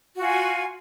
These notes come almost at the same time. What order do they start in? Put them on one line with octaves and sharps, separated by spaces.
F#4 F4 G#5